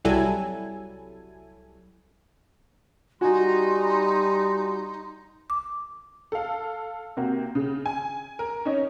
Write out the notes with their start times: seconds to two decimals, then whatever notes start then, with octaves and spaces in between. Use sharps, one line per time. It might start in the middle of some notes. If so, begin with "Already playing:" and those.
0.05 C2 F#3 G3 E4 A4 G#5
3.21 G3 D#4 F#4 G#5 C6
5.50 D6
6.32 A4 F5
7.17 C3 A#3 F#4
7.55 C#3
7.86 G#5
8.39 A#4
8.65 C#4 D#4 C#5 D#5